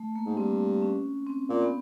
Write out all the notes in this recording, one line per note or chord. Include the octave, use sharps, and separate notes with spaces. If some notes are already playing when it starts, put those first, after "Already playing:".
Already playing: A3
A#3
G#2
G2 C4
C#4
C4
A#2
B3